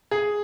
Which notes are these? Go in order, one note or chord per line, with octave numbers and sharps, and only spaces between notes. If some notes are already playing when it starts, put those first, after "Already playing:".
G#4